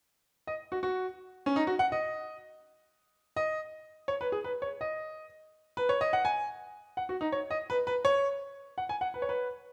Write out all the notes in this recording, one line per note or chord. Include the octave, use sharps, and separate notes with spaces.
D#5
F#4
F#4
C#4
D#4
F#4
F#5
D#5
D#5
C#5
B4
G#4
B4
C#5
D#5
B4
C#5
D#5
F#5
G#5
F#5
F#4
D#4
C#5
D#5
B4
B4
C#5
F#5
G#5
F#5
B4
C#5
B4